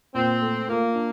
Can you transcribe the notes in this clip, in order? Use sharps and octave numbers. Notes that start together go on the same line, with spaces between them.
A#2 C4
A3
A#3 F4
D4